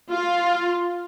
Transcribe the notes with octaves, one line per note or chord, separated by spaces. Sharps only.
F4